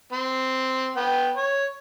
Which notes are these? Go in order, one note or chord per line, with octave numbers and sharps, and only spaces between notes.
C4
B3 G5
C#5